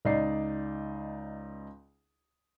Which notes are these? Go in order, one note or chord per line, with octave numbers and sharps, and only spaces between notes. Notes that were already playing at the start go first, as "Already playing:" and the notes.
C#2 D#4 D5 C7